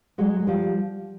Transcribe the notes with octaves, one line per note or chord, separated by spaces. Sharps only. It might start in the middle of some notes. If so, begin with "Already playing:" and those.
F#3 G#3
G#3
F3 G3